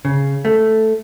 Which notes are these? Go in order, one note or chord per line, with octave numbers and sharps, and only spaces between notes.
C#3
A3